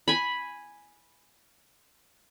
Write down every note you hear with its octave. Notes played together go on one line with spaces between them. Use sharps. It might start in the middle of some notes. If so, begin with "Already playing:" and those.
G#5 B5